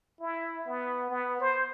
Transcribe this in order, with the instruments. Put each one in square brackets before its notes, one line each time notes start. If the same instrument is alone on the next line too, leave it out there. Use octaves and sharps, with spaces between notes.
[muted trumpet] E4
B3
B3
C5